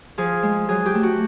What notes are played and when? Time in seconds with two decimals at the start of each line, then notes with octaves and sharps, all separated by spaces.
0.18 F3 G#4
0.43 G#3
0.69 F#3 G#4
0.86 G4
0.95 A3
1.03 F#4